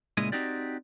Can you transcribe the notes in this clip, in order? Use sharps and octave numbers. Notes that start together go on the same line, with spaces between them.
C#2 A#2 G#3 E4 D#5 G#5
C4 D#4 F#4 G4 D5